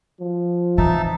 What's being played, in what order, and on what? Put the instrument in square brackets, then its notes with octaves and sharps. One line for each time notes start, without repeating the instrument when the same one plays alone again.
[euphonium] F3
[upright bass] C3 E3 [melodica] D#4 E5 A5